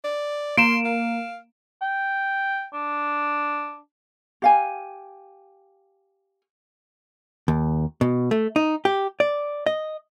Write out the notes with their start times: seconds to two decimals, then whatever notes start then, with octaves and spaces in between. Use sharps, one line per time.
0.04 D5
0.57 A#3 C6 D7 E7
0.85 F5
1.82 G5
2.73 D4
4.42 G4 F5 G#5
7.48 D#2
8.01 B2
8.31 A3
8.56 D#4
8.85 G4
9.20 D5
9.66 D#5